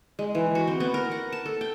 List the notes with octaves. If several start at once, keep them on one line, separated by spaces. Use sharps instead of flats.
G#3
E3
F#4
C4
B3
A#4
F#5
A5
A4
G5